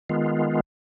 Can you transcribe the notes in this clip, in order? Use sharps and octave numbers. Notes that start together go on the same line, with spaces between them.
D#3 G#3 B3 F4